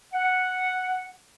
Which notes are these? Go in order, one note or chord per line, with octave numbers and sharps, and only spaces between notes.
F#5